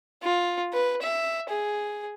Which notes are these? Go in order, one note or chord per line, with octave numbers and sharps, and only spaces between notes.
F4
B4
E5
G#4